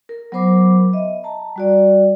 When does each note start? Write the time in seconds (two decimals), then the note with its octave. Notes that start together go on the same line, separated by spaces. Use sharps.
0.09 A#4
0.32 F#3 B3 A#4 C5 B5 D6
0.93 D#5 E5
1.24 A5 A#5
1.56 G3 F#4 D5